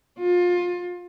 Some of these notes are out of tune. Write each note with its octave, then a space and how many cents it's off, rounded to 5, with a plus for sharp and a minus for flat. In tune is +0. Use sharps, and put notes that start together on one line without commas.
F4 +25